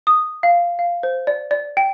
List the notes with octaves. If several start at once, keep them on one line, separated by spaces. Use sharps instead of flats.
D#6
F5
F5
C5
D5
D5
G5